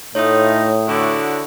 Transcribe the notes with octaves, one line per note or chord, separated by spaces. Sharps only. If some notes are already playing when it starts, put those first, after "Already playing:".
A2 A3 D#4 F4 C#5 D#6
D3 E4 F#4